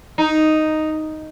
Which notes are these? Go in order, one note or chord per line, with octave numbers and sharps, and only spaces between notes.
D#4